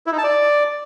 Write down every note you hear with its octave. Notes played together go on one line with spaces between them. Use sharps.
E4
D#4
A5
D5